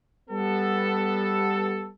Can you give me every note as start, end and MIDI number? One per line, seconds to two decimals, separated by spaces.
0.30 1.89 55
0.30 1.89 59
0.30 1.89 69